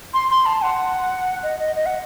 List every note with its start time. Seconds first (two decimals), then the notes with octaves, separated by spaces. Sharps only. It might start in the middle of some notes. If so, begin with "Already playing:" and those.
0.14 C6
0.30 C6
0.46 A5
0.62 F#5
1.43 D#5
1.60 D#5
1.76 D#5
1.86 F#5